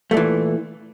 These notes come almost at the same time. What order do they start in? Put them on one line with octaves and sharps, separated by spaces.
A3 A#2 E3